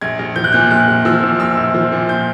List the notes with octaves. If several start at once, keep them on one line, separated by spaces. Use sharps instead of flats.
A#1 G#6
A#1
F3 G6
F#6
A#2 G6
A#1 F#6
A#1
F3 E6
A#2
A#1 E6
A#1
F3
A#2
G6